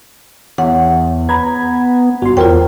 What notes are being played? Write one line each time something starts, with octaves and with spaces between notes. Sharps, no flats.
E2 C#5 F#5
B3 A#5 B5 G#6
G1 F#4 C6
E2 F4 A#4 C5 C#5 G5